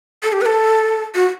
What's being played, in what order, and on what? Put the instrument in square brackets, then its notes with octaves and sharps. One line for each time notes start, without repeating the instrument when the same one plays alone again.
[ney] A4
G4
B4
A4
F#4